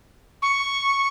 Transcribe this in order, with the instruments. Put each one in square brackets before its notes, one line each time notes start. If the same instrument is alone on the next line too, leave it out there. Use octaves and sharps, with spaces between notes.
[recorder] C#6